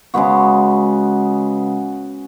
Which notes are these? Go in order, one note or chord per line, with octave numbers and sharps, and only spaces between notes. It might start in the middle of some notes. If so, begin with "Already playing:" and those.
C#3 G#3 B3 F#4